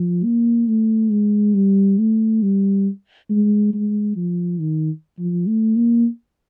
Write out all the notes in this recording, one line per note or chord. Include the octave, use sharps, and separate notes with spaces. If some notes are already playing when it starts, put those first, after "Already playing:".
Already playing: F3
A#3
A3
G#3
G3
A3
G3
G#3
G#3
F3
D#3
F3
A3
A#3